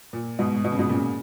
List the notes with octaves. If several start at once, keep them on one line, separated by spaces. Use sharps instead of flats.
A#2
G#2 B2
B2
C#3
G#2 B2
A#2 C#3